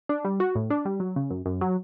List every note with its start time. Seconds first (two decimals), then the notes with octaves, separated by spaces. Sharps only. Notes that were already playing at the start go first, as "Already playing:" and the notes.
0.09 D4
0.25 G3
0.40 F#4
0.55 A2
0.70 D4
0.85 G3
1.00 F#3
1.16 C#3
1.31 F#2
1.46 F#2
1.61 F#3